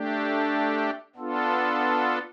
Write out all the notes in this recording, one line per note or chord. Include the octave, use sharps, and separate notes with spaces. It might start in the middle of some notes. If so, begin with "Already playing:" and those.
Already playing: A3 D4 G4
B3 D4 F4 A4